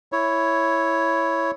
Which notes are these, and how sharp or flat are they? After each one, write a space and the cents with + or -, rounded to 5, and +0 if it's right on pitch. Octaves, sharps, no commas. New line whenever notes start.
E4 +0 C#5 +0